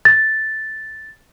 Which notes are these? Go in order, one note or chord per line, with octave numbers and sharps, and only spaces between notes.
A6